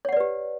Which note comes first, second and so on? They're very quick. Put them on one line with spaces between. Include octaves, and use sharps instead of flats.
C#5 F#5 D5 B4 G4